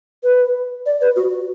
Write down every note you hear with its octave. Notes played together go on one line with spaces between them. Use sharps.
B4
D5
B4
F#4